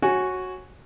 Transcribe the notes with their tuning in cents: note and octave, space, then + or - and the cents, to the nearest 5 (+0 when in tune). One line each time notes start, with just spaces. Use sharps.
F#4 +0 C#5 -20 G#5 +0